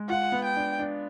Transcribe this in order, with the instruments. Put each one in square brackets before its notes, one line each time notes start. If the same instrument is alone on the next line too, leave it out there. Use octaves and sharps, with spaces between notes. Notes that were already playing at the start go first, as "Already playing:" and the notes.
Already playing: [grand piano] G#3
[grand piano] F4 [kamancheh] F#5
[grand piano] B3
[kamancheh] G5
[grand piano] D4
D4